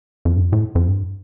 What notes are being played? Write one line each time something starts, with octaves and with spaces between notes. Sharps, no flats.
F2
G2
F2
A2
F2
G2